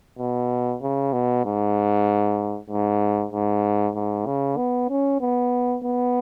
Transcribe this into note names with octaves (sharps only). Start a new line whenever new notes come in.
B2
C#3
B2
G#2
G#2
G#2
G#2
C#3
B3
C#4
B3
B3